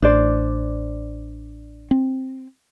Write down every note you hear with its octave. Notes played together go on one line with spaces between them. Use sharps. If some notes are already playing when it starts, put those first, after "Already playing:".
A1 D4 C5 D5
C4